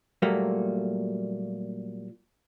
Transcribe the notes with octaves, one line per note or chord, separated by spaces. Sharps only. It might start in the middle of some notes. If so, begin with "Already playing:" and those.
A#2 F#3 G3 A3 A#3